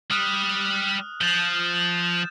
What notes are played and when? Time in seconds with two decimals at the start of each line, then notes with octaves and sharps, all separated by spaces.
0.11 G3 D#6 F6 F#6
1.21 F3 G6 A6 E7